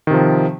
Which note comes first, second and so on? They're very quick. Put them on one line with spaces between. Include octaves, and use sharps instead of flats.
D#3 C3 F3